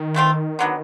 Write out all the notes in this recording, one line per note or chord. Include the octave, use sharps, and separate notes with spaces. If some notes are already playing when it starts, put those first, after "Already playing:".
Already playing: D#3
E3 A3 C4 F4
D3 F#3 B3